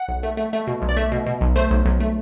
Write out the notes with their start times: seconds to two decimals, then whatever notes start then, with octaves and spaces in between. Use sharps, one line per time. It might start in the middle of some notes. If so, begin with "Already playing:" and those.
Already playing: F#5
0.08 B1
0.23 A3
0.37 A3
0.53 A3
0.67 B2
0.82 B1
0.89 D5
0.96 A3 E5
1.12 B2
1.26 B2
1.41 B1
1.56 A3 C5
1.71 B1
1.85 B1
2.00 A3